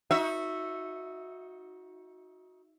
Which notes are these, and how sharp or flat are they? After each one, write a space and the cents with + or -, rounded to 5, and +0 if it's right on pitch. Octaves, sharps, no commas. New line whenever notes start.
D#4 +25 F#4 -15 E5 +0